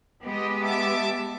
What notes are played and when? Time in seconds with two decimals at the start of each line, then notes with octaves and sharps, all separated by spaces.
0.25 G#3 B3 G4 D#5
0.61 E5 A5 D6